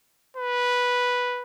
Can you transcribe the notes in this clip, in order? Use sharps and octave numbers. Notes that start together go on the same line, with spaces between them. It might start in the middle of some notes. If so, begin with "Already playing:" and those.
B4